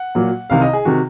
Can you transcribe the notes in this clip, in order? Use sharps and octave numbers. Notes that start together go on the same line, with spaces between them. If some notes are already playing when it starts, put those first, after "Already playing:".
Already playing: F#5
A#2 F#3 A#3
C2 C3 D#3 F5
D#5
G#4
C3 D#3 F#4